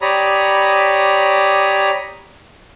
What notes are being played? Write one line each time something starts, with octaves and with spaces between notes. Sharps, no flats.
G4 C#5 D5 A#5 B5 D#6